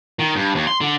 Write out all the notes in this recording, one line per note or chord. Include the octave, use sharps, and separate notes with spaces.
D#3
G2
D#2
C6
D3